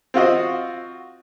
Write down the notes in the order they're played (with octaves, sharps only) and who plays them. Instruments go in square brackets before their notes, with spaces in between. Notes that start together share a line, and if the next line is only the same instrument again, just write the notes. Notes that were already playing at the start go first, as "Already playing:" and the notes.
[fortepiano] C4 F4 F#4 D#5